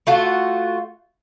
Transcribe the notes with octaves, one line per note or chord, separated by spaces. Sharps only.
A3 F4 F#4